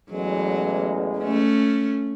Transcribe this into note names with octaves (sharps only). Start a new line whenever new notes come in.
A1 E2 F#3 G#3
A3 C#4